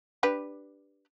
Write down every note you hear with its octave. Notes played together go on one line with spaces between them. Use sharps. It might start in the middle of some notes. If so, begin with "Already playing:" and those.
D4 G4 B4